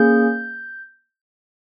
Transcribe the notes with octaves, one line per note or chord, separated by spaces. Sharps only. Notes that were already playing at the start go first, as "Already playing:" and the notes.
Already playing: A#3 C#4 G#4 G6